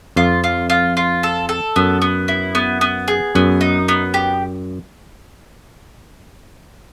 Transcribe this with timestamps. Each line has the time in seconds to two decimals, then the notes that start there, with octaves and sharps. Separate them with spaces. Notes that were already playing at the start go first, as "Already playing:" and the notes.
0.16 F2 F4
0.44 F4
0.70 F4
0.97 F4
1.23 A4
1.49 A4
1.76 F#2 B3
2.02 B3
2.28 E4
2.55 B3
2.81 B3
3.08 G#4
3.35 F#2 B3
3.61 D#4
3.88 B3
4.14 G4